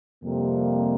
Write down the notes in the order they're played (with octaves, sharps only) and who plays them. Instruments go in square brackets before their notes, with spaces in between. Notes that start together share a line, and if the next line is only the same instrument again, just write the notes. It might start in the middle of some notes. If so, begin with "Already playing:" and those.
[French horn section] F2 C3 G3 A#3